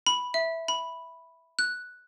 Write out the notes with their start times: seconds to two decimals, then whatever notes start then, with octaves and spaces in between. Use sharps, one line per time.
0.07 B5
0.34 E5
0.68 B5
1.59 F#6